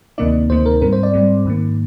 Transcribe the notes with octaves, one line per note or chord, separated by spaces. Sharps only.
D2 C3 D#3 A#3 D#4 D5
D2 C3 D#3 A#3 D#4 C5
A#4
G#2 G3 C4 A#4
C5
D5
G#2 G3 C4
G#2 D#3 A#3